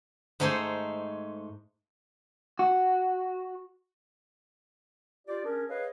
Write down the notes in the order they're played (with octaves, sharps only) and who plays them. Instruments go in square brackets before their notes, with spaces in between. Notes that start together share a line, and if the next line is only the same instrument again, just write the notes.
[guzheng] G#2 A3 D#4 G#4 C5
[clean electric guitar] F#4
[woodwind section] F4 G4 D5
C#4 D4 G#4 A#4
G#4 B4 C#5 D#5 F5